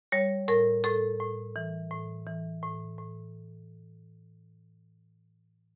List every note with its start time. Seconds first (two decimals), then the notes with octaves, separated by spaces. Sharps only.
0.12 G3 C#5
0.48 A2 A#4
0.84 A2 A4
1.20 A2
1.56 E3
1.91 A2
2.27 E3
2.63 A2
2.99 A2